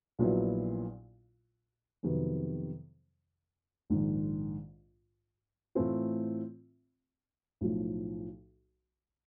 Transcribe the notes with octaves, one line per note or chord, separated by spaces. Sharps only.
A#1 A#2 F#3 B3 E4
F2 C3 D#3 F#3 B3
A#1 G#2 D#3
A2 E3 A3 C4 F4
B1 A2 F3